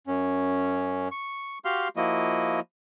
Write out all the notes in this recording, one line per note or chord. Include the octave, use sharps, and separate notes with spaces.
F#2 C#4
C#6
F#4 G4 F5 C6 F6
F3 A#3 E4 F#4 D#5